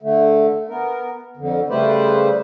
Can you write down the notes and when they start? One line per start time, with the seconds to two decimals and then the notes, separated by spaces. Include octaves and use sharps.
0.02 D3 A3
0.69 B3 A#4
1.37 F2 D3
1.70 C#3 G3 A3 B4 C5 D5